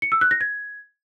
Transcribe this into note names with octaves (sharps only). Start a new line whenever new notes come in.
C#7
E6
F#6
A#6
G#6